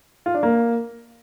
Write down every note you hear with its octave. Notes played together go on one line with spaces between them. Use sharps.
F4
D4
A#3